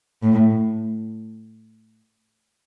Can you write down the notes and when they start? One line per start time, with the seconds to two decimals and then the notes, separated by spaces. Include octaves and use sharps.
0.23 A2